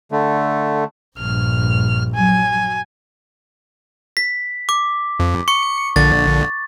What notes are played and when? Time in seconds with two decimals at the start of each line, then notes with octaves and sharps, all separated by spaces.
0.12 D3 A3
1.19 A#1 G2 F6
2.14 F#3 G#5
4.17 B6
4.69 D6
5.20 F2
5.48 C#6 C#7
5.96 A#1 D3 A6